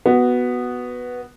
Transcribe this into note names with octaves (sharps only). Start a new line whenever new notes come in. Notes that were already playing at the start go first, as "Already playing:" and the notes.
B3 F#4